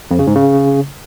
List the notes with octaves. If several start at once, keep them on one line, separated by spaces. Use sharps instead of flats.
F2
C#3
G#2
C#3